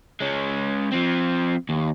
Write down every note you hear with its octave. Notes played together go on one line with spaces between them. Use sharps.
G#3 C#4
F3 C4
D#2